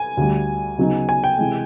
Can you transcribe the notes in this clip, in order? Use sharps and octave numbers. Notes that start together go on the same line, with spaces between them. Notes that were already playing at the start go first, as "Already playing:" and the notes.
Already playing: G#5
D2 D3 G3
C#3 F#3 B3 D#4
G#5
G5
C3 E3 G#3